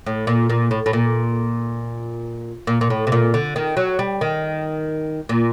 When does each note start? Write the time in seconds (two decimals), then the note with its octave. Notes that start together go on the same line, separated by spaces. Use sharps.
0.06 A2
0.27 A#2
0.49 A#2
0.71 A2
0.86 A2
0.93 A#2
2.67 A#2
2.81 A#2
2.90 A2
3.07 C3
3.12 A#2
3.34 D3
3.56 D#3
3.77 F#3
3.99 G3
4.21 D#3
5.29 A#2